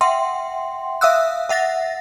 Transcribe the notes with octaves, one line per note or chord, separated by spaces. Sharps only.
E5 F#5 G5 C6
E5 F5 D#6 E6 F#6
E5 F#5 A6 A#6